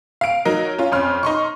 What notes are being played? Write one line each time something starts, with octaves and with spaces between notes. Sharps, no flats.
F5 D7
F#3 D#4 A#4
C#4 F4
F2 C#4 C6 F6
D#4 C6 C#6